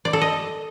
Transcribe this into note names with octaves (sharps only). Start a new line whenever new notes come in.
D5
A4
D#5